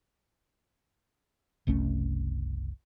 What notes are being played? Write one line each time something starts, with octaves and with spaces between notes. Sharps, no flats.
F#1 C2 A3 C#4